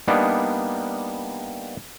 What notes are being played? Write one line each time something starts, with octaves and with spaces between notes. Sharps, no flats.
G3 A#3 B3 D4 D#4